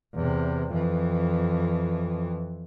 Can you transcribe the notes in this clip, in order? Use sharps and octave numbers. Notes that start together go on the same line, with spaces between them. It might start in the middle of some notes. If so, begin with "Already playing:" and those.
E2 C3
F2 E3